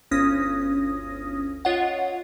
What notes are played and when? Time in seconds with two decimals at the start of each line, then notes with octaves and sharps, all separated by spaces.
0.11 G1 D2 C#4 D#6 A#6
1.65 F4 C#5 D#5 F#5